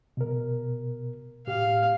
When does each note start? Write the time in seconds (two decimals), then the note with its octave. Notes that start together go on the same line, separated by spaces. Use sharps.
0.17 B2 A#4
1.47 A2 G4 F5